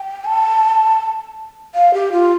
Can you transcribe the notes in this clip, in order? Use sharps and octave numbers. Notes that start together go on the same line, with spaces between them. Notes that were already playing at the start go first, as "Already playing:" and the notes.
Already playing: G5
A5
F5
G4
F4